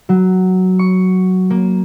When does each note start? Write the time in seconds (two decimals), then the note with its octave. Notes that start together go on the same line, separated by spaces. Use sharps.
0.09 F#3
0.79 C#6
1.50 A#3